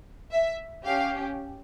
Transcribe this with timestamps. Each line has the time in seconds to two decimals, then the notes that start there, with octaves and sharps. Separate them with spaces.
0.32 E5
0.85 C#4 G4 F5